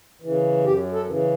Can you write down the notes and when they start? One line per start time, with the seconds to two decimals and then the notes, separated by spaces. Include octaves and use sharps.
0.22 C#3 E3
0.65 F#2 G4
0.93 A4
1.07 C#3 E3